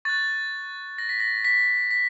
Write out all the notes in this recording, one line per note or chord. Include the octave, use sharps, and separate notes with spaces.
C#6 F#6 A6
A#6
B6
A#6
B6
B6